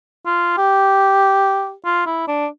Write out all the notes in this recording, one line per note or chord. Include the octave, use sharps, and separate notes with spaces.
F4
G4
F4
E4
D4